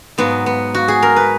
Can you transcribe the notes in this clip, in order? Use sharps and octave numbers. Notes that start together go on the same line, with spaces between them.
G#2 F#3 B3
B3
F#4
G#4
A#4
B4